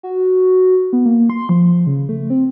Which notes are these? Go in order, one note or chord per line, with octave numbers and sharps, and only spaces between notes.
F#4
B3
A#3
C6
F3
C#3
A3
C4